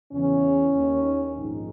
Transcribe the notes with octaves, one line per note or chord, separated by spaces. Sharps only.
E2 C#3 E3 C#4
D#2 D#3
A#1 G#2 D#3 D#4